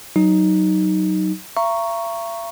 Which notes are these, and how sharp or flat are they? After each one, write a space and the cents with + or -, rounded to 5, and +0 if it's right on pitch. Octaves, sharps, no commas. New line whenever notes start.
F#3 +15 D#4 +0
E5 +45 A#5 +0 C#6 +0